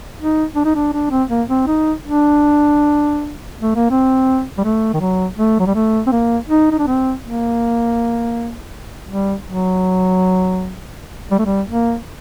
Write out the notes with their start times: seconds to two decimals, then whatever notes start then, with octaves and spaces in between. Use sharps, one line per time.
0.19 D#4
0.56 D4
0.65 D#4
0.75 D4
0.93 D4
1.11 C4
1.30 A#3
1.49 C4
1.67 D#4
2.04 D4
3.62 A3
3.76 A#3
3.90 C4
4.58 G3
4.64 A3
4.94 D#3
5.00 F#3
5.38 A3
5.59 F#3
5.67 G3
5.75 A3
6.07 C4
6.12 A#3
6.49 D#4
6.72 D#4
6.79 D4
6.87 C4
7.23 A#3
9.09 G3
9.47 F#3
11.31 G3
11.39 A3
11.46 G3
11.69 A#3